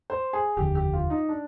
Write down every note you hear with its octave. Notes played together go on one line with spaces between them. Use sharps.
C5
G#4
F1 D#2 D3 F3 G4
G4
F4
D#4
D4